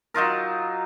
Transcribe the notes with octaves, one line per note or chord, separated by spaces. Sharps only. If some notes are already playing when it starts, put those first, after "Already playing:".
F#3 D#4 F4 A#4